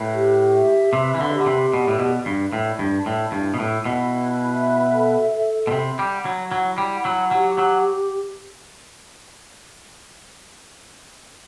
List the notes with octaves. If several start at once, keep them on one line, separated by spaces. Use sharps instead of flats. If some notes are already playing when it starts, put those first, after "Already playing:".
Already playing: A2 B4
G4
E5
C3 B4
E3
D3
G4
D3
C3
B2 D5
A2
B2
B4
G2
A2 D5
G2
A5
A2
G2 E4
B2
A2
E4
B2
B4
E5
A4
A4
B2
C3 B5
G3
F#5
F#3
F#3 E4
G3
F#5
F#3
F#3 G4
F#3